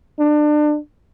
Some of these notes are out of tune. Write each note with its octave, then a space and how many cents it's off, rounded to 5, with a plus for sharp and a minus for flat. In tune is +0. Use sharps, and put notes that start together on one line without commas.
D4 +30